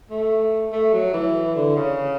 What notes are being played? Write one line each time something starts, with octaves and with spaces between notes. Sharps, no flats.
A3
A3
F#3
E3
D3
C#3